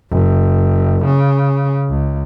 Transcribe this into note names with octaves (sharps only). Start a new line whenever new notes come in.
F#1
C#3
C#2